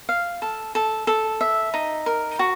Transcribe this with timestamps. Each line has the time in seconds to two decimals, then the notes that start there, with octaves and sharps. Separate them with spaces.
0.09 F5
0.42 A4
0.75 A4
1.07 A4
1.41 E5
1.74 D#4
2.06 A#4
2.39 F#4